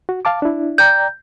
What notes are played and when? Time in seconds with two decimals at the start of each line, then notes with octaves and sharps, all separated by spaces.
0.09 F#4
0.25 F5 A5 D6
0.42 D4 E4
0.78 D5 G5 A#5 G6